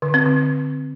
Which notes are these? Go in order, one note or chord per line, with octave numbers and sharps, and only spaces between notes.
D3
C4
D3